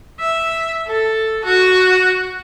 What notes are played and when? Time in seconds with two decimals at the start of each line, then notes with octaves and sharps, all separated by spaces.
0.20 E5
0.88 A4
1.44 F#4